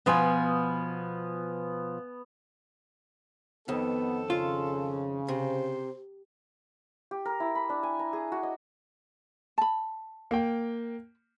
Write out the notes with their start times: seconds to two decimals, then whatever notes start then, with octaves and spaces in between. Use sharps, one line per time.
0.06 B2 F3 B3 F4 G#5
3.68 F2 D#3 B3 A4
4.30 C#3 F4
5.28 C3 C5
7.11 G4
7.25 A#4
7.40 E4
7.55 B5
7.69 D4
7.83 G#5
7.99 A#5
8.13 G#4
8.32 F#4
8.43 D#5
9.58 A5 B5
10.31 A#3 G5